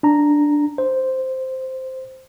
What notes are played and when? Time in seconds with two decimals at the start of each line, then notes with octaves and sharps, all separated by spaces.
0.03 D4 A#5
0.78 C5